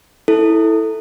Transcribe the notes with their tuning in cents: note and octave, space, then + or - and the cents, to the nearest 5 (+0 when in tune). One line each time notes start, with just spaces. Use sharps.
E4 -15 A4 +0